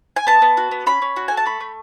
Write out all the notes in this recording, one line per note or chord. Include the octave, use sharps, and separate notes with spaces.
G#5
B3 A5
B3
F#4
B3
C#4 B5
C#4
F#4
A4 G#5
A5
A3 B5
A3